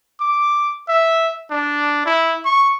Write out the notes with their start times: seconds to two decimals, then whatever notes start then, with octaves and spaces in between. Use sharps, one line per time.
0.21 D6
0.89 E5
1.51 D4
2.06 E4
2.45 C#6